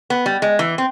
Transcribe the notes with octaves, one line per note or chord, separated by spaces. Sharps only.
B3
G3
G#3
E3
C4